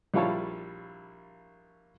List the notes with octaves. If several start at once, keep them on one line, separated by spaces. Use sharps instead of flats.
A#1 G3 E4 F4 C#5 A5